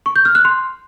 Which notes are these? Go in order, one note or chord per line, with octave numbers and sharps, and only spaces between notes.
C#6
G6
F6
F#6
C6